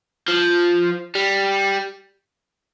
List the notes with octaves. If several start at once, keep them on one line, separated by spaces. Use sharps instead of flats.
F3
G3